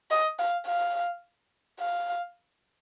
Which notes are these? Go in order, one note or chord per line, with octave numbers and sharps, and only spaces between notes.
D#5
F5
F5
F5